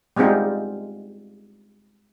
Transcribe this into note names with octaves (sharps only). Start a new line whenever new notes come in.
G3 G#3 B3 C4 D#4 F4